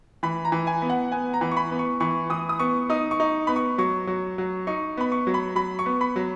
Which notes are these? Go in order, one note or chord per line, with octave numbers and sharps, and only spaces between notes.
E3 B5
A#5
E3
G#5
B3
F#5
B3 G#5
A#5
E3
C#6
B5
B3
C#6
E3 C#6
E3 D#6
D#6
B3 C#6
D#4 D#6
C#6
D#4
B3 B5
C#6
F#3 C#6
F#3
F#3
D#4 C#6
B3 B5
C#6
F#3
B5
F#3 B5
C#6
B3
B5
F#3